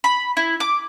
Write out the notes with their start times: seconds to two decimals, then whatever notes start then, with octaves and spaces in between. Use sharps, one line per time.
0.04 B5
0.37 E4
0.60 D6